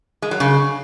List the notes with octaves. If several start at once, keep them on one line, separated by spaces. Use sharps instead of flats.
G#3
F#3
C#3